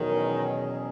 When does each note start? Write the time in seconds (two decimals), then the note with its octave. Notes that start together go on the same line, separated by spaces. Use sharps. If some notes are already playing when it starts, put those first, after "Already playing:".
Already playing: E2 B2 D#3 F#3 C#4 G#4